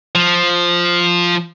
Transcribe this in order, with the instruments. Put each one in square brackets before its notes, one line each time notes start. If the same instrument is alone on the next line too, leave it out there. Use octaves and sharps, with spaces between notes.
[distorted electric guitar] F3